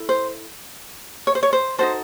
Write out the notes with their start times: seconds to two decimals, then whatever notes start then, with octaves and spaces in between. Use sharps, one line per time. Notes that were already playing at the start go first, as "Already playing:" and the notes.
Already playing: E4 A4
0.09 C5
1.27 C#5
1.35 C5
1.43 C#5
1.53 C5
1.79 D#4 F#4 A4 C5